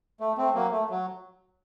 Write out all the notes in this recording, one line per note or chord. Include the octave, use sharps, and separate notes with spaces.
A3
A3 C4
F#3 A#3
A3
F#3